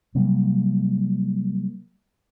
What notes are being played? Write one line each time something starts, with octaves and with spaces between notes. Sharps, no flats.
C3 F#3 G3 A#3